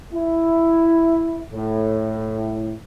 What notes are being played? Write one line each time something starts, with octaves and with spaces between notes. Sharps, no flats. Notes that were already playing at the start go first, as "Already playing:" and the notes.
E4
A2